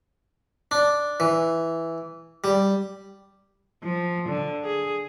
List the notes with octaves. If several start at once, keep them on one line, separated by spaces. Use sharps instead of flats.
D4
E3
G3
F3
D3
G#4